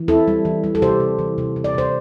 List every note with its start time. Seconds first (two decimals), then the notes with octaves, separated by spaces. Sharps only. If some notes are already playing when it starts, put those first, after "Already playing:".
Already playing: E3
0.08 C4 E4 A4
0.28 G3
0.45 E3
0.64 G3
0.75 A4
0.82 C3 G4 C5
1.00 C3
1.19 E3
1.38 C3
1.56 C3
1.64 D5
1.74 C3 C5